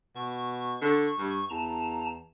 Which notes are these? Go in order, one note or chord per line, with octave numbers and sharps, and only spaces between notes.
B2 C#6
D3
G2
E2 A5 A#5